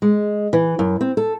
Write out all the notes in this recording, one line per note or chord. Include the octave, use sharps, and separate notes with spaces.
G#3
E3
F#2
C4
A4